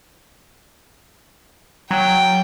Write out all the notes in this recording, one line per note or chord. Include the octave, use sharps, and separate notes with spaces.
F#3 G5